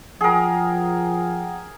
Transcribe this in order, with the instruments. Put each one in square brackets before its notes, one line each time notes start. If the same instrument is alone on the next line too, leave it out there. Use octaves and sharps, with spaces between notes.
[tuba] F3 [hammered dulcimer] G#4 A#4 [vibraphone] F#5 G5 D#6